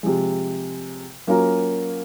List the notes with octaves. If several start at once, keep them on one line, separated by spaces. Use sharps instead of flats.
C3 F3 G#3
F#3 A#3 C#4 F4 A#4